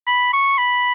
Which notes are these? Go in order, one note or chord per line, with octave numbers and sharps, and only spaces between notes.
B5
C#6
B5